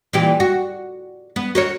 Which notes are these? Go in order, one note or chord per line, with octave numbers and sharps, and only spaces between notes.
A#2 E3 G4
F#4
B3
F#4 A#4 C#5